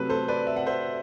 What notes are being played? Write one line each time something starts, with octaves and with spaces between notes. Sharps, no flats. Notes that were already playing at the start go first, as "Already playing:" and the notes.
Already playing: C3 F#3 A3 B4
A4 C5
B4 D5
E5
F#5
C5 E5